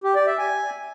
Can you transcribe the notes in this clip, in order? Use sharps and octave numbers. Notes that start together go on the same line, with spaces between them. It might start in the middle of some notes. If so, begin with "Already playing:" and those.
G4
D5
E5
G#5